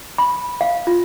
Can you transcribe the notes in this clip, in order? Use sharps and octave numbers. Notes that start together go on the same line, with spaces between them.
B5
F5
F4